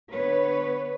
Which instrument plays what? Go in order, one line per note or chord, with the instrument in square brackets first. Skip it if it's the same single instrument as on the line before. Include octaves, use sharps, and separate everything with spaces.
[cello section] D3 B3 B4 C#5